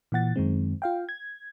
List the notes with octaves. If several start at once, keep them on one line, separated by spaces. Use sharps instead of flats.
A#2 E3 F#5 A6
F#2 D#3 G#3 C4
F4 F5 G5
G#6